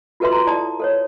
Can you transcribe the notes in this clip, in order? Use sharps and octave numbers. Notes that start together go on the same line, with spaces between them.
F4 F#4 A4 B4 E5 C6
A#5
E4 D5 A5 D#6
A4 C5 C#5